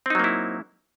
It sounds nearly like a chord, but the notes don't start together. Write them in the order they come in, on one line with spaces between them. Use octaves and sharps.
C4 D#4 F#3 A#3 E4